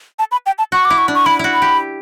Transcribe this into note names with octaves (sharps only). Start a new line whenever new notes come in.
A5
B5
G5
A5
F#4 C#6
D6
E4
C#6
D4
C#6
E4 B5
E4 F#4
B5
G4